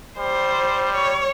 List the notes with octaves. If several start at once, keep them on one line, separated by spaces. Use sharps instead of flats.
G3 C5
C#5